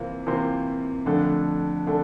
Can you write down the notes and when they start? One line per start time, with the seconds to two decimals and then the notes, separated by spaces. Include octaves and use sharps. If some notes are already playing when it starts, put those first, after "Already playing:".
Already playing: C3 E3 A#3 F4
0.26 C3 E3 A#3 F4 C5
1.06 F2 D3 A3 D4 A4
1.87 D3 A3 D4 A4